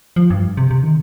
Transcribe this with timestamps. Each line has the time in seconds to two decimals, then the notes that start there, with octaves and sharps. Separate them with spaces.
0.16 F3
0.30 G2
0.57 C3
0.71 C3
0.83 D#3